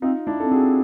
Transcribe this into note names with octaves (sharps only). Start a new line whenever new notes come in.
C4 D#4 F4
D4 E4
C4 A4
F#4 G#4